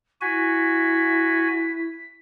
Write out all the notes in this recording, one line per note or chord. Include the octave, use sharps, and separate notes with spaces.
E4 F#4 G#5 B6